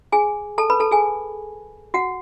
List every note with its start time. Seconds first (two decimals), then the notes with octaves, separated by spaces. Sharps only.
0.12 G#4 G#5
0.58 A4 A5
0.70 B4 B5
0.80 A4 A5
0.91 G#4 G#5
1.94 F#4 F#5